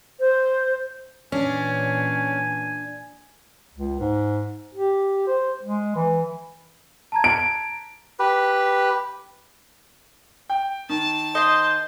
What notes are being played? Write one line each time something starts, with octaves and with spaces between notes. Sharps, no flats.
C5
A#2 E3 C#4 D4 G#5
C#2
G#2
G4
C5
G#3
E3
A5 A#5 G#6
D7
G4 B4
G5
D#3 A5
C5 D#5 C6